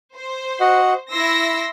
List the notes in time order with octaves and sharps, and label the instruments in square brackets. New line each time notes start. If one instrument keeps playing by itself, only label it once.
[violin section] C5
[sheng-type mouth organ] F#4 D#5 F#5
[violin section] E4 E6 A#6 [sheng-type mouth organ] C6